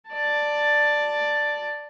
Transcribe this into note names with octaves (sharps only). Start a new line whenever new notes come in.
D5 A5